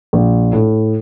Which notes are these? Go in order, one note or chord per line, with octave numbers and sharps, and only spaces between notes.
A#1
A2